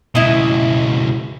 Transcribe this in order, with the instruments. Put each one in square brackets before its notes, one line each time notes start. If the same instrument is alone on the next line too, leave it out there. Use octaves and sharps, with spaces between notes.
[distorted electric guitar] C#2 B2 [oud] E4 D#5